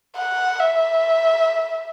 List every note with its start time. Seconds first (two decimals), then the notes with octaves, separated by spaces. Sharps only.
0.17 F#5
0.59 E5